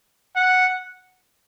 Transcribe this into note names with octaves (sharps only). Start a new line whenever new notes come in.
F#5